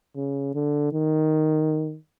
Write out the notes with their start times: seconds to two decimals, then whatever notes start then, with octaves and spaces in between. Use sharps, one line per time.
0.16 C#3
0.55 D3
0.93 D#3